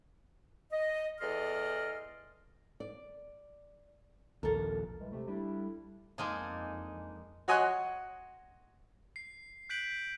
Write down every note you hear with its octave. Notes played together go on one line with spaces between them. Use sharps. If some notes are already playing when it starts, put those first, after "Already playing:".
D#5
E2 A4 D5 D#5 C6 F6
D5
A#1 D#2 A4 A#4
E3 G3 G#3
C3 A3
G3 A3 D4 E4
F2 G#3 A#3 D4 D#4 G#4 G#5
F#4 C#5 D#5 G#5 C6 F#6
C7
F#6 G6 B6 D7 F#7